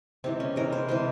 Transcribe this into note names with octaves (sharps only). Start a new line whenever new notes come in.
C3 E3 G#3 C4
C#4
C3 E3 G#3 A#4
C5
C3 E3 G#3 C5